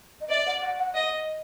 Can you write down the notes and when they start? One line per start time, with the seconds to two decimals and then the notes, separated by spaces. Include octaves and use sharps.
0.21 D#5
0.30 D5 E5
0.47 F#5
0.62 F#5
0.79 F#5
0.95 D#5